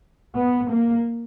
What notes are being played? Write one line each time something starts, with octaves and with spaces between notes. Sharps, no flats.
B3
A#3